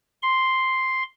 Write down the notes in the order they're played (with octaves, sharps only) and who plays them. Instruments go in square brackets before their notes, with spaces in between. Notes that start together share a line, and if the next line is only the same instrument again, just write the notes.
[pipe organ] C6